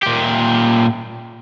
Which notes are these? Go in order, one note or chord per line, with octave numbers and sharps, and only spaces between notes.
A#2 G4